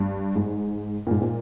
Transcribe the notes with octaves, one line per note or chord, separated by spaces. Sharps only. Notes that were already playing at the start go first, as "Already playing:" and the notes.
Already playing: G2
G#2
A#2
G#2
A#2